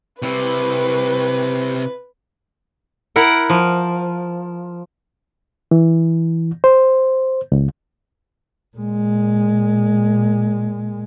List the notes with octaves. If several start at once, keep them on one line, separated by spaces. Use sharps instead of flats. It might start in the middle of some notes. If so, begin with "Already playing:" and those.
C3 E4 B4
E4 A#4 F#5
F3
E3
C5
C#2
A#2 G#3